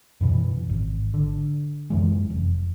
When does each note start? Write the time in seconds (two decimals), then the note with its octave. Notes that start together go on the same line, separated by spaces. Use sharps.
0.21 F#2 B2 E3
0.69 G#1
1.14 D3
1.90 F#2 E3 G#3
2.30 F1